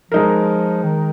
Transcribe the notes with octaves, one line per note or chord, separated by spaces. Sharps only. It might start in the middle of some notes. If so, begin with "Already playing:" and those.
F3 G#3 D#4 A#4
D#3